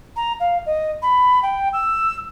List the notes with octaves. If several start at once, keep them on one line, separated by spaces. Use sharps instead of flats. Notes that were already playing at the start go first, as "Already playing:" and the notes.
A#5
F5
D#5
B5
G5
E6